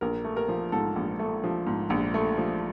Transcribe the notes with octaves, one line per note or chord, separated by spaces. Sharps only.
A#1 A#4
A3
A#4
F3
G#2 A4
A#1
A3
F3
G#2
A#1
A3
F3